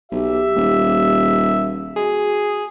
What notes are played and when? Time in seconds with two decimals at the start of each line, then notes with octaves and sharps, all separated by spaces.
0.12 B1 G4 E5
0.56 D#1
1.96 F#4 G#4